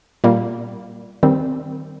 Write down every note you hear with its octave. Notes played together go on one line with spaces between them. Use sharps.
A#2 G3 A#3
D#3 G3 C4